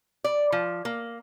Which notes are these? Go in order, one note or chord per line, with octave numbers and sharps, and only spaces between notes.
D5
F3
A#3